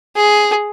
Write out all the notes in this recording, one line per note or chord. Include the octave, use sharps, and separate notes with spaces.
G#4